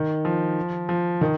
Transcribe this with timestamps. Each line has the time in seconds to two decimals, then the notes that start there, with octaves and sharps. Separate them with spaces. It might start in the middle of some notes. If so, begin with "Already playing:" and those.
Already playing: D#3
0.25 F3
0.89 F3
1.21 D#3